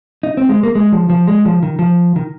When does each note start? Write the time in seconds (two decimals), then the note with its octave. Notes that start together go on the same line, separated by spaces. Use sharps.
0.23 D#4
0.37 C4
0.49 G#3
0.63 A#3
0.75 G#3
0.92 F3
1.10 F3
1.27 G#3
1.45 F3
1.63 D#3
1.79 F3
2.16 D#3